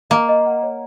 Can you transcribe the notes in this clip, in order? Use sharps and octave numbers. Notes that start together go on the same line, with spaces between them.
A#3 D#5
D#5
F#5
C#5